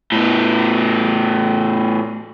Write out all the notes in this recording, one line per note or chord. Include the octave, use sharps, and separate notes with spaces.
A2 B3